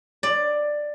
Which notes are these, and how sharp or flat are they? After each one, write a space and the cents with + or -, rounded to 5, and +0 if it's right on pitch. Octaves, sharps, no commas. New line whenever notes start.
D5 +10